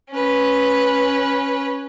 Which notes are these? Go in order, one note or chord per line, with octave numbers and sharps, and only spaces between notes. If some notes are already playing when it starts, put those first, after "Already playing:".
C#4 B4